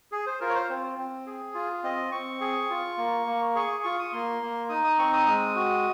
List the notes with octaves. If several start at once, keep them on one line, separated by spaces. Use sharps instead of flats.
G#4
C5
F4 A#4
C#5
C5
C4
C4
G#4
F4
C4 D#5
C4 C#6
G#4
F4
A#3
A#3
G#4 C#6
F4 C#6
D#6
A#3 C6
A#3
D#4 D#6
D#6
C4 C#6
D#6
G#3 D#6
F#4